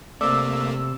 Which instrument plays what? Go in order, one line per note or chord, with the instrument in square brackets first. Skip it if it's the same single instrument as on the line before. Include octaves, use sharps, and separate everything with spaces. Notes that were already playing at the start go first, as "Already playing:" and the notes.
[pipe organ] C3 [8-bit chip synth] A3 A#3 [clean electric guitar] C5 D5 [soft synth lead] E6